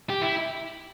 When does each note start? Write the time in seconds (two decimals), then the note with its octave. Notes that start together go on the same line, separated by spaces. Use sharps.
0.10 G4
0.22 E4